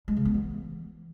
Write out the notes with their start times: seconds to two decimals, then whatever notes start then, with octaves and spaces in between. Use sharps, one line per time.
0.08 G#3
0.17 C#3
0.25 B3
0.34 E3